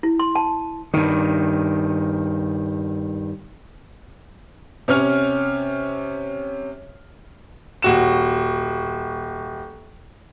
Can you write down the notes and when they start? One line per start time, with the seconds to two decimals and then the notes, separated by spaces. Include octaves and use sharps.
0.03 E4
0.19 C6
0.36 A5
0.94 G2 D#3
4.88 C3 C#4 C#5 F6
7.82 D#1 F#4 E7